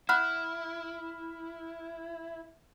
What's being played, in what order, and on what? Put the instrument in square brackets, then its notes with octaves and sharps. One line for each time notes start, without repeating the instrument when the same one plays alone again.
[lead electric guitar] E4 [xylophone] F#5 B5 F#6 [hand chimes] F6